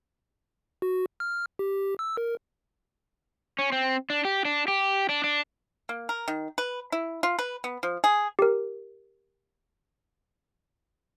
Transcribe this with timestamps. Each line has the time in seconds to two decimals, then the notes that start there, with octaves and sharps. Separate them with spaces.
0.82 F#4
1.20 F6
1.59 G4
1.99 E6
2.17 A#4
3.59 C#4
3.72 C4
4.10 D4
4.25 G4
4.45 D4
4.68 G4
5.09 D4
5.24 D4
5.89 A#3
6.09 A#4
6.28 D#3
6.58 B4
6.92 E4
7.23 F4
7.39 B4
7.64 B3
7.83 F3
8.04 G#4
8.39 G4 A#4